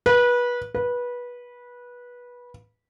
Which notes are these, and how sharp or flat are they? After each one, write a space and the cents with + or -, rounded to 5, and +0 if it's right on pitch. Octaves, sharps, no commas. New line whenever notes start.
B4 -25
B4 -20